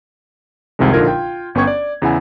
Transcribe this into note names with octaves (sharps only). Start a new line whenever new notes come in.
C2 F2 C3 D#3 G#3
A#1 D3 D#4 F4 A#4 G#6
F4 G5
G1 B3 C#4 G5 C#6 G#6
D5
E2 C#3 E4 F#5 G#5